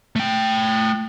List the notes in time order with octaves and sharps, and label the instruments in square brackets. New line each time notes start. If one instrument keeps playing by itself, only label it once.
[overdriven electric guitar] A3 G5